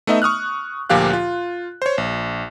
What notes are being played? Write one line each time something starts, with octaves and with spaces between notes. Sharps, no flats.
A3 B3 D#4 D#5 E5
C#6 D#6 F6 F#6
D2 A#2 F3 G4 F5 F#6
F4
C5 C#5
A#1